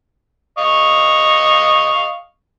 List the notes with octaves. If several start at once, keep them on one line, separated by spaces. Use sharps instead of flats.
D#5 F5 C#6